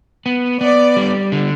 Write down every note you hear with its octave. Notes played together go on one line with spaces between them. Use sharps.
B3
B3 D5
G3
D3